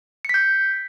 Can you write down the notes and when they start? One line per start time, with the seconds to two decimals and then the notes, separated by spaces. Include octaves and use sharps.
0.25 C#7
0.29 B6
0.34 G6